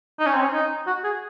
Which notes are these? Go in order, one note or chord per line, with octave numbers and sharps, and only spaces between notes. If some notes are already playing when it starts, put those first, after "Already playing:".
D#4
C#4
C4
C#4
D#4
F#4
G#4